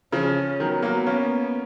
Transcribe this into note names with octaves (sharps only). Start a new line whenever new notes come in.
C#3 F3 C#4
D#3 F#3 B3
F#3 A#3
A#3 C#4